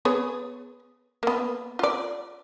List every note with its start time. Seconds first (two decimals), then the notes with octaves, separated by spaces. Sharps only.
0.05 B3 G#4 C#5
1.23 A#3 B3
1.79 F4 D5